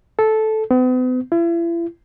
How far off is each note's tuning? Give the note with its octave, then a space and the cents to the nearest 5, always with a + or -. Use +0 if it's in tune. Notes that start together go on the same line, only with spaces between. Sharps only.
A4 -10
B3 +45
E4 +40